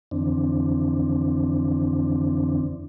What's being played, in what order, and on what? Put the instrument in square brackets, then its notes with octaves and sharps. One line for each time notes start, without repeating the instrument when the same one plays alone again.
[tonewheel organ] F2 D3 E3 C4 D4